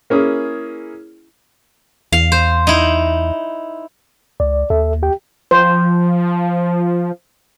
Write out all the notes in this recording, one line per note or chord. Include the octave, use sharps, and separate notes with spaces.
A#3 C#4 E4 G#4
E2 F5
C5
D#4 E4
C#2 D5
D#2 A4 E5
G4 G5
F3 C5